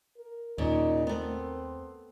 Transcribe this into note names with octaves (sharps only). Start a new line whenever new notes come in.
A#4
D#2 A#2 C#3 D#4
A3 B3 C4